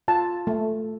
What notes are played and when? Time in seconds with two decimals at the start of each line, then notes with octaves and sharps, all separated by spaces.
0.08 F4 A5
0.47 A3